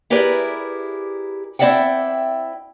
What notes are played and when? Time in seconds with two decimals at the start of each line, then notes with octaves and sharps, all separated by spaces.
0.10 E4 G4 G#4 A#4 B4 D5
1.59 C4 E4 D5 E5 F#5 G5